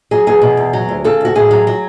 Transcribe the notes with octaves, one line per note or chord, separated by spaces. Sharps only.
F#3 G#4
E2 G#4
B2
E2
F#3
D2
C#3 A4
D2 F#4
A2 G#4
F#3
F#3